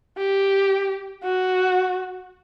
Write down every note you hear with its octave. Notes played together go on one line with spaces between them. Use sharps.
G4
F#4